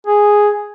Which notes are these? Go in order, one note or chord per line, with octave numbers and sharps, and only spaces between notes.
G#4